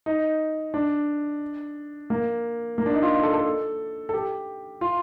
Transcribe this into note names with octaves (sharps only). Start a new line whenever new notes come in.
D#4
D4
A#3
A#3
D4
D#4
F4
A4
A4
A4
G4
F4